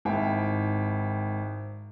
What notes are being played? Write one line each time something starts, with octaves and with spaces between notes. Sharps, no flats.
G#1 E4 G5